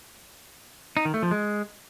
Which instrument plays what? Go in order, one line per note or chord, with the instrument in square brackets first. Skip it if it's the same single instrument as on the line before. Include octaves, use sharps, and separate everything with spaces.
[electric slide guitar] D#4
D#3
A3
F3
G#3